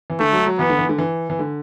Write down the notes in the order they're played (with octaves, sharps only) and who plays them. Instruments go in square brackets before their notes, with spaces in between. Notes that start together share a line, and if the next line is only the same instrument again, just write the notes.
[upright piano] E3
[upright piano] D3 [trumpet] A3
[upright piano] F#3
F#3
[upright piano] E3 [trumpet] B3
[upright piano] D3
E3
D3
E3
E3
D3